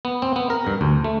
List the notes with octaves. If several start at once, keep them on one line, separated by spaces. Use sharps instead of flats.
B3
C4
B3
A#4
G2
D2
A3